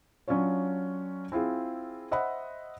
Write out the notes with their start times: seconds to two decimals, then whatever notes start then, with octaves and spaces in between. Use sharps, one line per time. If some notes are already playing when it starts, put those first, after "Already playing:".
0.28 F#3 C#4 D4 F4 C#5
1.32 C4 E4 F4 G#4
2.11 C5 D#5 E5 F#5 B5